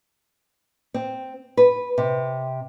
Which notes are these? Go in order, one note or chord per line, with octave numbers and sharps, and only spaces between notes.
C4
B4
C3